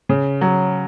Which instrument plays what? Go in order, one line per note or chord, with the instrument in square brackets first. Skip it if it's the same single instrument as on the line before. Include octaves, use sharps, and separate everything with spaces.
[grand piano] C#3
F#3